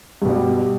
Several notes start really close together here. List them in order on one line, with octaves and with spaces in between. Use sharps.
G2 B2 G3